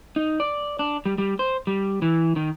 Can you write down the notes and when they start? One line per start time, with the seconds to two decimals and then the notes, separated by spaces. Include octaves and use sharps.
0.16 D#4
0.40 D5
0.79 D4
1.06 G3
1.18 G3
1.39 C5
1.67 G3
2.02 E3
2.36 D#3